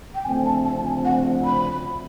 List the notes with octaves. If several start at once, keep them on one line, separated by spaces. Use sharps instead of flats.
G5
D2 C#3 F3 A3 C4 G#5
A5
A5
G#5
F#5
B5